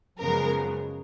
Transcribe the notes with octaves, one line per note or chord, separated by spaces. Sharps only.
F#2 C#3 F3 G#3 B3 A#4